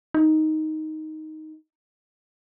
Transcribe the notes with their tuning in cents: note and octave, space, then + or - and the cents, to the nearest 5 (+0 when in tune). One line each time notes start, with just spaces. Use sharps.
D#4 +5